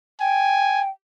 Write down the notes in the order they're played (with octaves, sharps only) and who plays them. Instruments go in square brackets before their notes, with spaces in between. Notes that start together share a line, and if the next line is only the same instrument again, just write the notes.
[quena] G5 [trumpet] G#5